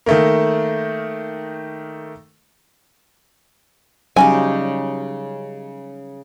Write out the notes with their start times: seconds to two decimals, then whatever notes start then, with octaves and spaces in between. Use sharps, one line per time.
0.06 D#3 A3 A#3
4.16 C#3 F#3 G3 C#4 D#4 G4 G#5